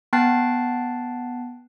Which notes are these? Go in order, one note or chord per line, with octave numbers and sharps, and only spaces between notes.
B3 G5 A5 F#6 A6 C7